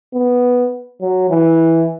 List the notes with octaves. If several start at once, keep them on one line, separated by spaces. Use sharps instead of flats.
B3
F#3
E3